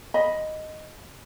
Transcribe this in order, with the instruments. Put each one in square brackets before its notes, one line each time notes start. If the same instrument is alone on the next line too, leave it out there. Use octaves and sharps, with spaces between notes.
[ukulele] D#5 B5